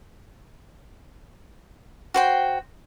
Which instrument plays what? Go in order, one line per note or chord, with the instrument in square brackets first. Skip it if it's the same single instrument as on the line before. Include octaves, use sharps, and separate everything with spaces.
[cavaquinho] F#4 C5 G5